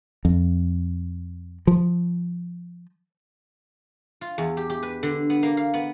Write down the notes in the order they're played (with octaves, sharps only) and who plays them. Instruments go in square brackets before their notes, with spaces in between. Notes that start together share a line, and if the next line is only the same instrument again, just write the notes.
[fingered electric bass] F2
F3
[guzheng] F4
E2
G4
G4
B4
D3
B3
A#3
F5
B3